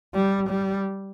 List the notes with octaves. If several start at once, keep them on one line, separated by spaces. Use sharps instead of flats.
G3
G3